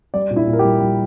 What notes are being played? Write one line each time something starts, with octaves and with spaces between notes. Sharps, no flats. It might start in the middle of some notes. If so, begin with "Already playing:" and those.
G3 D5
A#2
E4
A#2
A#4
G4
G3
G3